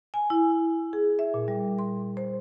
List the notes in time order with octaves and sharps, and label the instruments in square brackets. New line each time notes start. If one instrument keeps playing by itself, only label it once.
[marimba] G#5
E4
G#4
E5
A#2
G3
C6
C5